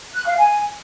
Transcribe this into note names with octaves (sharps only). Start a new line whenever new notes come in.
F#6
F5
G#5